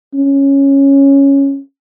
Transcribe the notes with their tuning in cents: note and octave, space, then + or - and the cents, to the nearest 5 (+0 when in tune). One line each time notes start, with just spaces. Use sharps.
C#4 -5